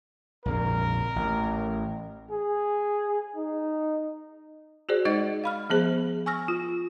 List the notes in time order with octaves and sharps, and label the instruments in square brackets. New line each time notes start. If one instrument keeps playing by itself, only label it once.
[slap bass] A#1 F2 C#3 [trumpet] A#4
[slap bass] A1
[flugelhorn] G#4
D#4
[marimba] F#4 G#4 C5 D5
G#3 D#4 D5 D#5 A6
F5 B5 F6
F3 B3 G#4 C5
G#5 C#6 E6 F6 A#6
F4